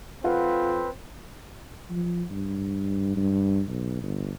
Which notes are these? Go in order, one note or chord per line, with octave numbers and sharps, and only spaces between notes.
F2 C4 F4 B4 F5 F#5
F3
G2
G2
B1
G1